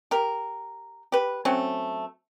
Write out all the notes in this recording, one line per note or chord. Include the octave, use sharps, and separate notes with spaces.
G4 A#4
G4 B4
F#3 A3 C4 C#4